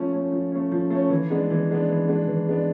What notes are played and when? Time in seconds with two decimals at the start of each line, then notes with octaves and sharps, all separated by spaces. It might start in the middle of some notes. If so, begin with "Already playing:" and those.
Already playing: F3 A3 C#4
0.13 A3 C#4
0.32 F3
0.52 A3 C#4
0.72 F3
0.90 A3 C#4
1.10 E3
1.31 G#3 B3 D4
1.50 E3
1.70 G#3 B3 D4
1.89 E3
2.08 G#3 B3 D4
2.27 E3
2.48 G#3 B3 D4